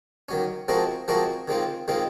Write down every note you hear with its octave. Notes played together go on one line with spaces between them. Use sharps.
D#3 F#3 C#4
F3 G#3 C4 F#4 A#4
F3 G#3 C4 F#4 A#4
D#3 G#3 C4 F4
D#3 G#3 C4 F4